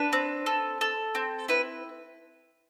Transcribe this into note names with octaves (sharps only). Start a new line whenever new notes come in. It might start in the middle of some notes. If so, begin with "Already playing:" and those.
Already playing: D4 B4
C4
A4
A4
C4
E4 B4